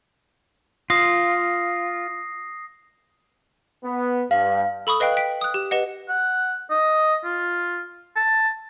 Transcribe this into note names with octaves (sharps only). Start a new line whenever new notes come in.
F4 D#6 A#6 C7
B3
G2 F5
A4 B5 C#6 D#6
B4 D#5 F5 G5 F#6
G5 B6
D#6 F#6
G4
G4 B4 D#5 F#5
F#5
D#5
F4
A5